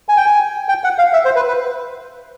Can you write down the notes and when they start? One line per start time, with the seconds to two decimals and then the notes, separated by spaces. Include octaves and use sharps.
0.09 G#5
0.17 G5
0.26 G#5
0.69 G5
0.84 F#5
0.98 F5
1.13 E5
1.25 C5
1.36 B4
1.48 B4